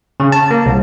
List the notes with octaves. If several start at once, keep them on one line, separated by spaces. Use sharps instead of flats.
C#3
A5
A#3
C2